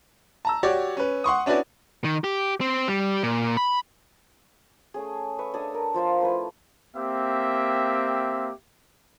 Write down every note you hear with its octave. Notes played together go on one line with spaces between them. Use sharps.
A5 A#5 E6
F#4 G4 C#5 D5
C#4 B4
F#5 C6 C#6 D#6
C#4 D4 E4 F#4 B4 D5
D#3
G4
C4
G3
A#2
B5
A3 C#4 G#4
B4 E5 C#6
D4 A4 C#5 D#6
A#4
F3 F4 C5 F5
A3 E4 B4
A#3 C4 G4 E5